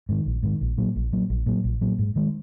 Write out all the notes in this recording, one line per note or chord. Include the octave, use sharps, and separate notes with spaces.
G#2 D#3
A#1
G#2 D#3
A#1
A#2 F#3
A#1
A#2 F#3
A#1
A#2 F#3
A#1
A#2 F#3
G#2
D#3 G#3